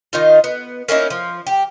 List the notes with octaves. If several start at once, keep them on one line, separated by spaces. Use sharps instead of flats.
D#3 D#4 F4
B3
A#3 C#4 D#4 E4
F3
G4